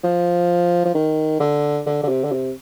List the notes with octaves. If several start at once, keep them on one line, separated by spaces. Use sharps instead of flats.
F3
F3
D#3
D3
D3
D3
C3
D3
C3